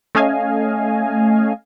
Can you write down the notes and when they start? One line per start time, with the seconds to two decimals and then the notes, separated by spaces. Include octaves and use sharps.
0.15 A3 C#4 D#5 F5 G#5